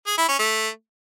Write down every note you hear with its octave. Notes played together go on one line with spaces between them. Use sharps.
G#4
E4
C#4
A3